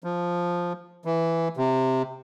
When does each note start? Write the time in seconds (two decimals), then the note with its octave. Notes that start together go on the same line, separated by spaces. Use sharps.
0.04 F3
1.05 E3
1.57 C3